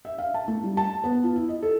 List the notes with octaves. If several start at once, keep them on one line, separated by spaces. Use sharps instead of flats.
E5
F5
A5
A3
G3
A5
B3
F4
E4
D#5
A4